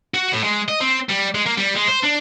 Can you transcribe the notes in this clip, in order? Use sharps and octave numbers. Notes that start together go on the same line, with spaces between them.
F#4
A2
G#3
D#5
C4
G3
G#3
A#3
G3
G#3
C5
D4